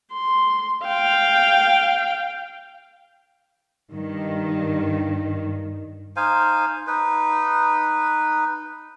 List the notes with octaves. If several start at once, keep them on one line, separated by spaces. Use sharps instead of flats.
C6
F5 G5
G2 D#3
D#4 C5 F5 G#5
D#4 B4